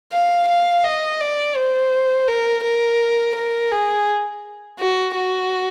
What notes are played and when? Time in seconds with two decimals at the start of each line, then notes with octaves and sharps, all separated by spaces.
0.12 F5
0.49 F5
0.84 D#5
1.20 D5
1.56 C5
2.28 A#4
2.64 A#4
3.36 A#4
3.72 G#4
4.79 F#4
5.15 F#4